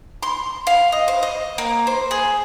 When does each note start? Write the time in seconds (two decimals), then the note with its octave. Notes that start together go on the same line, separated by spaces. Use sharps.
0.23 C6
0.67 F5
0.92 D#5
1.08 C5
1.23 D#5
1.58 A#3
1.87 C5
2.11 G#4